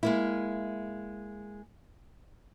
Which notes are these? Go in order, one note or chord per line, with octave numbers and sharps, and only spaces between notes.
G#3 A#3 E4